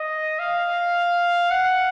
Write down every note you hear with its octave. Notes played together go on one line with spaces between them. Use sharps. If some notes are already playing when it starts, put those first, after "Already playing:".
Already playing: D#5
F5
F#5